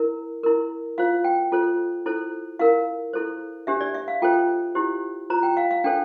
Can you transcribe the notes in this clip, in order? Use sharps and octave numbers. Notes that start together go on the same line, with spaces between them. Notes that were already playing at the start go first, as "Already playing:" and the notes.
Already playing: E4 A#4
E4 A#4
F4 C5 F5
G5
F4 A4 C5
E4 A4 C5
E4 A#4 F5
E4 A4 C5
D4 G4 C5 E5
D5
E5
F5
F4 A4 C5 G5
E4 G4 C5
F4 C5 A#5
G5
F5
F5
D4 A4 C5 G5